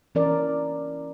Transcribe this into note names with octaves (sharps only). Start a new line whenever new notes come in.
E3 C#4 A#4 D5